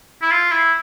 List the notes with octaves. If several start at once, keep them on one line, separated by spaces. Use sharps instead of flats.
E4
F4
E4